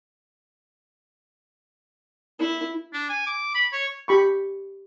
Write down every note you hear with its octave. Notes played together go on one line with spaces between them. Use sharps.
E4
D4
G#5
D6
B5
C#5
G4 B5 C#6